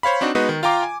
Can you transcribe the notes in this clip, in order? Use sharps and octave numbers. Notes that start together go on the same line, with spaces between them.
C5 C#5 F5 B5
C4 D4 D#4 F#4
G#3 B3 D#4 F#4 B4
D#3
F4 F5 G5 A#5 D6
G#5